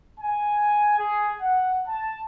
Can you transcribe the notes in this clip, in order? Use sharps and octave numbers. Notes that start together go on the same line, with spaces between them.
G#5
G#4
F#5
A5